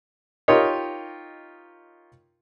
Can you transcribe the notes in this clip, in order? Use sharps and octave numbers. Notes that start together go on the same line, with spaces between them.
D#4 F4 G4 A#4 C#5 D#5